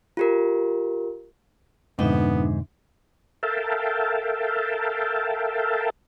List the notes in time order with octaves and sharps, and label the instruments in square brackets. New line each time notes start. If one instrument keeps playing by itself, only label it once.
[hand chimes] F4 G4 A#4
[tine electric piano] F2 B2 D3 [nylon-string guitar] G#2 [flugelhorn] B3 [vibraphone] D4 D#4 E5
[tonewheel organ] A4 A#4 E5 F5 G5 A5